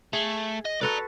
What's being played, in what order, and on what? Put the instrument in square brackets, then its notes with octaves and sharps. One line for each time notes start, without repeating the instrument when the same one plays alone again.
[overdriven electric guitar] A3 [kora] G#4
[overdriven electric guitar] D#5
[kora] F#4 A4 B4 [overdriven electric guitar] D5 A#5